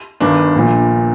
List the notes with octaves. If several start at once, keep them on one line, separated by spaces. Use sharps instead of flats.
G1 G2 D#3 D4
A#1 A#2